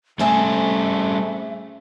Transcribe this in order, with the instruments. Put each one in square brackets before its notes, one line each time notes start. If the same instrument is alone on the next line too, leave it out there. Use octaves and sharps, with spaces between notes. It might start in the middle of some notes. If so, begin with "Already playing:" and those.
[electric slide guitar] G3 C#4 C5 [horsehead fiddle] A3 [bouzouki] C4 G#4 A4 [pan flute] E5